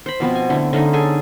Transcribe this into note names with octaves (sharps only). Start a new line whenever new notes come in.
C5 B5
B2 F3 B3 C4
G#5
D3 A3 E4
D3 A3 C#4 D#4
G#4 A4 G#5